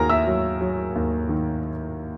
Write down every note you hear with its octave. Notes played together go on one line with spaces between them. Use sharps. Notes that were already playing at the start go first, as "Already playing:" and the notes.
Already playing: D#2 D#3 F#4 G#4 A#4 G#5 A#5
E5 E6
F#3
F#3
D#2
D#3